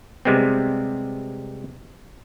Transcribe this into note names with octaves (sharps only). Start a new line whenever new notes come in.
C3 G3 G#3 B3 C4